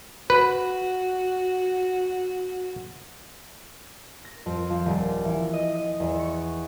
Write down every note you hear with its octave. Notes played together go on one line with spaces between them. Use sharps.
F#4 B4
A#6
F2
F3
D#1
E3
D#5
D#5
E2
C#6